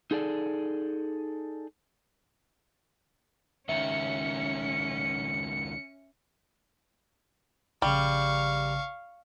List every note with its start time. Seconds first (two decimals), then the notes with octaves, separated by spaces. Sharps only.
0.11 D#4 G#4 A4 D5
3.69 C#2 D#3 C#4 E5 C#7
7.82 A#1 C#3 G3 F5 C#6